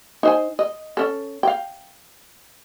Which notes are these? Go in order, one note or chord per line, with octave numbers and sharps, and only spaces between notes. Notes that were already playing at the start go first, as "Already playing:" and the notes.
D#4 C5 G#5
D#5
C#4 A4
F5 G5